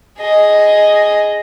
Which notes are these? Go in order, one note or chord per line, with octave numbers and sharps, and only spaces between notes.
G#4 D#5